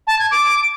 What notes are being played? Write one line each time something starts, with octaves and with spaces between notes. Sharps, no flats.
A5
G#6
D6